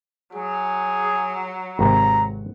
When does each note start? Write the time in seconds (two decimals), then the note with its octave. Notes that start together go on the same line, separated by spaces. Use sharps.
0.35 F#3 G#4
1.79 G#1 C3 A#5